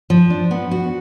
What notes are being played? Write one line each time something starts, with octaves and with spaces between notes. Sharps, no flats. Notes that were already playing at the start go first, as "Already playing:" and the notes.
F3
D4
B3
F#4